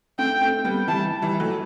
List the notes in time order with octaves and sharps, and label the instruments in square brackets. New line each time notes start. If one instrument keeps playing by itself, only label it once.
[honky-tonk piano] A3 C4 [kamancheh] G5
[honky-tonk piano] A3 C4
G3 B3
[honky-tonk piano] E3 G3 [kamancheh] A5
[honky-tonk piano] E3 G3
F#3 A3